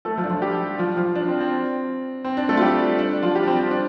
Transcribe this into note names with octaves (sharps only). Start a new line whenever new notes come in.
A3 A4
F3 F4
D4
F3 F4
G3 G4
F3 F4
F3 F4
D4
C4
C4
C4
D4
A3 A4
F4
G3 G4
D4
F3 F4
G3 G4
C4
C4
D4